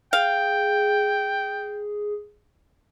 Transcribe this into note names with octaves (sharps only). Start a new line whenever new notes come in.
G#4 F5 G5